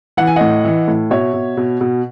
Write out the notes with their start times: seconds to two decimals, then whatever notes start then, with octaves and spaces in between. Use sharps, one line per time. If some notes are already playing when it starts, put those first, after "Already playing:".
0.17 E3 F#5
0.27 G#5
0.36 A2 D#5 F#5
0.65 E3
0.88 A2
1.11 B2 C#5 E5
1.34 B2
1.57 B2
1.81 B2